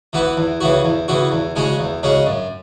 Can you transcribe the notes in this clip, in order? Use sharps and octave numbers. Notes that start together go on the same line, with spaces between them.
E3 B3 F#4 B4
E2
C#3 E3 B3 F#4
E2
C#3 E3 B3 F#4
E2
C#3 G#3 C#4 F#4
E2
C#3 G#3 C#4 F#4
F#2